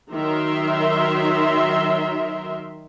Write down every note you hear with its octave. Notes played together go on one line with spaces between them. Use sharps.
D#3 F#3 A#4 E5 C6